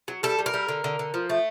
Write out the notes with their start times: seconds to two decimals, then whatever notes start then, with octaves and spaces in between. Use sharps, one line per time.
0.08 F#3
0.23 G3 A4
0.39 G3
0.46 A#4
0.54 G3
0.69 D3
0.84 D3
0.99 D3
1.14 F3
1.30 A3